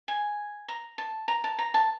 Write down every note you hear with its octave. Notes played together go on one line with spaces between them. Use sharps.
G#5
A#5
A5
A#5
A5
A#5
A5